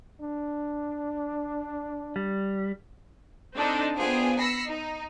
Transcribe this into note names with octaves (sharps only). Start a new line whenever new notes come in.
D4
G3
C4 D4 D#4 A4 D#5
B3 D4 F4 G#4 C5 G5
B5 E6 A#6 C7 C#7
D#4